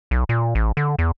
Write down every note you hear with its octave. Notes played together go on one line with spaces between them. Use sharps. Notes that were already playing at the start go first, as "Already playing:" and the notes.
B1
A#2
A1
D3
E2